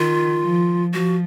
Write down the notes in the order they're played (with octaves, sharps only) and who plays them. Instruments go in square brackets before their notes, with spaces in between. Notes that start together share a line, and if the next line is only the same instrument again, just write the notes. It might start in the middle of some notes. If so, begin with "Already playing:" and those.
Already playing: [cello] D#3 [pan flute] F4
[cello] F3
[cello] F3 [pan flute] F#4